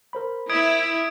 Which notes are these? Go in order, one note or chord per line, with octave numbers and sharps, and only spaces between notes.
A#4 C5 B5
E4 D#6 G#6 D7